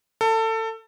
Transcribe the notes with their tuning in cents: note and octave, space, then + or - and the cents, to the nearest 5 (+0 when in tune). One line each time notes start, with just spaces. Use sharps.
A4 +25